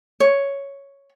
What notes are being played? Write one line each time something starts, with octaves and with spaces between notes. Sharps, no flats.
C#5